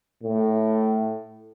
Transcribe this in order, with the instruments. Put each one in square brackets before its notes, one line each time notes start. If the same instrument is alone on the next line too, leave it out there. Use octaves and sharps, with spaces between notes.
[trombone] A2